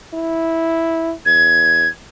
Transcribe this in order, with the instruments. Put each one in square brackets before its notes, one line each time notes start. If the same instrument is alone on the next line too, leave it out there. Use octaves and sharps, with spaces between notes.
[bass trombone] E4
[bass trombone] E2 [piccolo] G#6